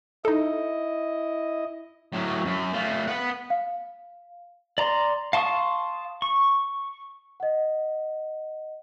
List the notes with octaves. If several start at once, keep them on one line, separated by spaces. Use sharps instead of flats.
D#4 E4 A4 D#5
A2 F#3
F#2
A3 F4
B4 F#5
F5
D5 A#5 C6
F5 A5 C6 C#6 D#6
C#6
D#5 F#5